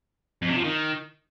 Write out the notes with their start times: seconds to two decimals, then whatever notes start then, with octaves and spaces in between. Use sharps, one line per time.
0.42 F2
0.50 C3
0.57 F3
0.64 D#3